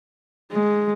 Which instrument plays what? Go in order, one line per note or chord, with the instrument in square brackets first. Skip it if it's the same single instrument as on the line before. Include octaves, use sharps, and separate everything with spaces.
[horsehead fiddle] G#3